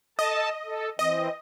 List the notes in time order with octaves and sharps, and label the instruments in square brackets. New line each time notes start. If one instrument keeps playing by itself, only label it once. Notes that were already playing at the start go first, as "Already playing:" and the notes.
[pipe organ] A4 A5 [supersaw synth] D#5
[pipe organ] A4
[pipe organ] E3 C4 [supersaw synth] D#5